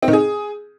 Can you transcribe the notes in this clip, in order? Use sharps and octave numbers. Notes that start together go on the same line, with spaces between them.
C4
D#3
G#4